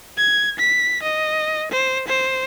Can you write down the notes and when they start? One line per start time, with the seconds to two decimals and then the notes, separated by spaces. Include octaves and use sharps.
0.18 G#6
0.59 B6
1.03 D#5
1.72 C5
2.08 C5